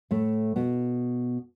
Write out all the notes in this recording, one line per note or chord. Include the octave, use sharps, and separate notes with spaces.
A2 A3
B2 B3